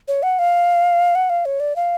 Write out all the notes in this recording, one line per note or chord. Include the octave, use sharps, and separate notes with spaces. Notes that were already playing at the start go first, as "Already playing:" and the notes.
C#5
F#5
F5
F#5
F5
C#5
D5
F5